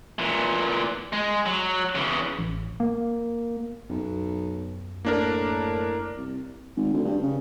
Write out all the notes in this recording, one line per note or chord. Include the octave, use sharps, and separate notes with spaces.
A#2 E3
G#3
F#3
C#3 E3
A1
A#3
B1 F#2
A2 A#3 D4 A#4
C2
G#1
D2
G2
C#3